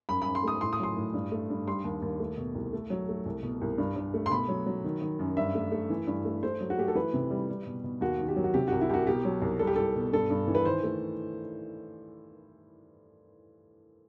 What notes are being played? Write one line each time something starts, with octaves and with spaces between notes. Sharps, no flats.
F#2 B5
F#2 B5
C6
A3 D#6
A2 C6
D#6
F#3 C6
A2
G2
A3
G2
G3 C6
D#2
D#2
A3
B2
C2
A3
F#3
A3
C2
B2
C2
G2
G2
A3
C6
B2 B5
F#3
F#3
D#3
D#3
F#2
G2 E5
A3
A3
E3
G2
A3
A3 C5
F#3
F#4
A3 G4
A4
E3 B4
C3
G3
G3
B2
B2
D#2 F#4
D#3
G4
F#3
F#4
C3 G4
F#4
C2
E4
C2 F#4 G4
B2 G4
F#3
C2
G3 A4
G4
C2 A4
B2
G2 A4
G2
E3
B4
D#3 C5
A3